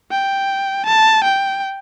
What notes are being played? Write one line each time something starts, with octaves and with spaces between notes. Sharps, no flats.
G5
A5
G5